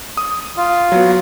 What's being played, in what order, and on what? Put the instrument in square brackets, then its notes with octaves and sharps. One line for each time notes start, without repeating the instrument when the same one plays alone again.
[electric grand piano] D#6
[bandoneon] F4
[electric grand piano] F#3 B3